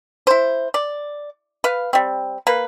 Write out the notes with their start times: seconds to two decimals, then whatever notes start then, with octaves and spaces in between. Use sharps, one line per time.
0.27 E4 C5
0.74 D5
1.64 B4 F5
1.93 G3 C4
2.47 A#3 B4